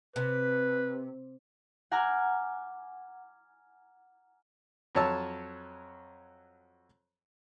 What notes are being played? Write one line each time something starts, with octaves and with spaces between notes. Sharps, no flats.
C3 B4
F#5 G#5 A#5 D6 F6
F2 F#3 C#5 A5 E6